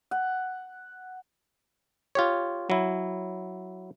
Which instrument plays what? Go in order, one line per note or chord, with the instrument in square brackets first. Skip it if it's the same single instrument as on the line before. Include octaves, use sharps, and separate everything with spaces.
[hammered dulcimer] F#5
[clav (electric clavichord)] F4 G4 C#5
F#3 E4